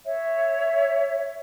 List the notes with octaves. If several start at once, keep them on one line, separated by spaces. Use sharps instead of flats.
C#5 E5